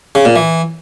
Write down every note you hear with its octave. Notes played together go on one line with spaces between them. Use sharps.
C#3
A#2
E3